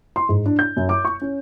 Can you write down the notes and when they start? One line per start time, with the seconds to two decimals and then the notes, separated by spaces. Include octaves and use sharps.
0.16 C6
0.29 G#2
0.46 D4
0.59 G6
0.77 F#2
0.89 D6
1.05 C#6
1.21 C#4